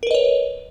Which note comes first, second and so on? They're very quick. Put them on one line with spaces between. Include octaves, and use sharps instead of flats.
A#4 B4 D#5 C#5